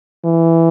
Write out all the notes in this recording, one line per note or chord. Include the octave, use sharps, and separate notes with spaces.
E3